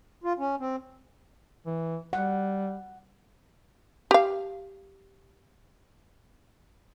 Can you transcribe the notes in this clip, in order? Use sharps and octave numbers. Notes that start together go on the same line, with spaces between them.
F4
C#4
C4
E3
G3 F#5
G4 F5